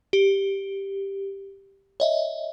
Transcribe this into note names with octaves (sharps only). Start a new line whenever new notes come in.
G4
C#5 D#5 E5